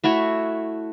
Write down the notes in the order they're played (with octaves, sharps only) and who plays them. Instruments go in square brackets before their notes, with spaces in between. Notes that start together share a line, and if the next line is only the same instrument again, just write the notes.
[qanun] A3 E4 F#4 C#5